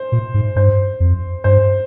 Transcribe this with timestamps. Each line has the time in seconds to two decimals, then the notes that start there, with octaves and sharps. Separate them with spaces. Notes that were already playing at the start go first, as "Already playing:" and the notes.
Already playing: C5
0.12 A#2
0.34 G#2
0.56 G2 C5
1.00 F2
1.44 G2 C5